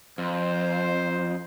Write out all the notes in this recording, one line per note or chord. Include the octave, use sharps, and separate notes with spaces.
F2 C5